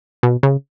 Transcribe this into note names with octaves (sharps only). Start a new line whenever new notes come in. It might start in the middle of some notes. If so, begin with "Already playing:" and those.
B2
C#3